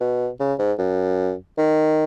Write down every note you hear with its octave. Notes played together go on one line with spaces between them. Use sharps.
B2
C#3
G#2
F#2
D#3